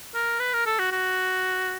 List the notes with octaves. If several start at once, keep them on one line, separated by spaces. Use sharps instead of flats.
A#4
B4
A#4
A4
F#4
F#4